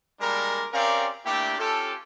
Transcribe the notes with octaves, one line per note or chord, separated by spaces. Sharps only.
G3 G#3 A#3 D4 A#4
C4 C#4 G4 A#4 D5 F5
A3 A#3 D4 E4 G4
C#4 F4 G4 A4